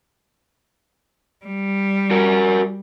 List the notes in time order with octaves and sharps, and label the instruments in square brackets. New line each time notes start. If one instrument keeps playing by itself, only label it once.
[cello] G3
[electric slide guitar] F#4 A#4